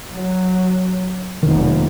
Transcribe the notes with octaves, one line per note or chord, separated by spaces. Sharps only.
F#3
F1 B1 D#3 A#3